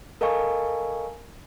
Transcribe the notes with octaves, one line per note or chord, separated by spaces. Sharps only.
A4 A#4 D#5 F5 G#5 C#6